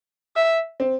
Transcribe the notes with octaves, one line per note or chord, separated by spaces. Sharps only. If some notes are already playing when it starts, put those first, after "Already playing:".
E5
C4